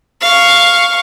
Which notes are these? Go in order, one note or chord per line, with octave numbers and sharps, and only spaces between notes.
F5 C#6